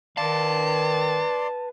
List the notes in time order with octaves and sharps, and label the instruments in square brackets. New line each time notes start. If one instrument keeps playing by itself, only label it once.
[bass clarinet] D#3 [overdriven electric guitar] B4 F5 [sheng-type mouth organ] D5 C6 [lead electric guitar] A5